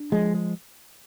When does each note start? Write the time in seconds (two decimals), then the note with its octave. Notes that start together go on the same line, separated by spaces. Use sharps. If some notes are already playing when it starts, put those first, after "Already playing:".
Already playing: D4
0.12 F3 G#3
0.35 G#3